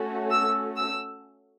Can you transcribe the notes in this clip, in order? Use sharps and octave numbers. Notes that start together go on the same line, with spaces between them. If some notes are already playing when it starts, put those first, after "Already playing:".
Already playing: A3 C#4 F#4 A4
E6
E6